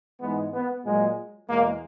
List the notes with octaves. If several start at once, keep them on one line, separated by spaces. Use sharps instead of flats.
G#2 E3 G#3 B3
B3
A#2 F#3 G#3
E2 B2 G#3 A#3